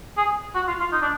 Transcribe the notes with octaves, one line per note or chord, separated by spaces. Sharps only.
G#4
F#4
F4
F4
D#4
D4